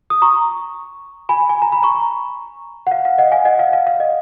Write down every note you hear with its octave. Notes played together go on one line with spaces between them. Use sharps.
D#6
A#5 C#6
G#5 B5
G#5
A#5
B5
A#5 C#6
F#5
F5
F5
D#5 F#5
F5 G#5
D#5 F#5
F5
F5
F5
D#5